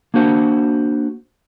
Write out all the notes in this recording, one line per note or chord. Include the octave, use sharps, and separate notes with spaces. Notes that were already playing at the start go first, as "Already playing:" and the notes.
A#3 D4 F#4 C5 F#5